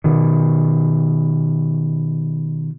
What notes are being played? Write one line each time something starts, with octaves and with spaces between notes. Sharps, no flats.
B2 D#3